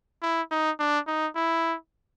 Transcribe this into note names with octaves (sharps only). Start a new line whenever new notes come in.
E4
D#4
D4
D#4
E4